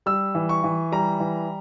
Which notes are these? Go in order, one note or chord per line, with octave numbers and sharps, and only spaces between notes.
G3 E6
E3
C#6
E3
G3 A#5
E3